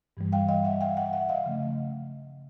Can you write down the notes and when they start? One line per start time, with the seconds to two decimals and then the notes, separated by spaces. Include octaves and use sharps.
0.17 G2 E3 G3
0.32 F5 G5
0.48 D#5 F5
0.65 E5 F#5
0.81 F5 G5
0.97 E5 F#5
1.13 E5 F#5
1.29 D#5 F5
1.46 C#3 F3 A3 C#4